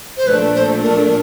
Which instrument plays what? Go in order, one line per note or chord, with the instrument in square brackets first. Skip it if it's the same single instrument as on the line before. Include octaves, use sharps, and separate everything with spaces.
[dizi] C5
[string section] A#1 A#2 F3 A3 D4 [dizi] B4
[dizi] C5
A#4